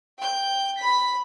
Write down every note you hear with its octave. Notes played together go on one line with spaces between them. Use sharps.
G5 G6
B5 B6